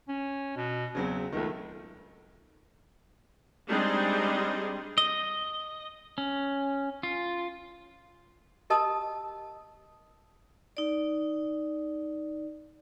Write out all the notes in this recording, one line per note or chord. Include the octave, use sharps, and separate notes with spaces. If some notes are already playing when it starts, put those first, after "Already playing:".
C#4
B2
E2 C#3 F#3 C4
C#2 D#3 A3
G3 G#3 C4 D4 D#4 G#4
D#5
C#4
F4
G4 A#4 D#5 A5 D#6
D#4 D5